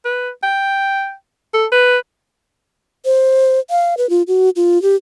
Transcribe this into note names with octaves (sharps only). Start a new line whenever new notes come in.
B4
G5
A4
B4
C5
F5
B4
F4
F#4
F4
G4